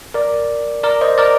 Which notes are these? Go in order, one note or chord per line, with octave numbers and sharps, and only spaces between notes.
A#4 D5
A#4 D5
C5 D#5
A#4 D5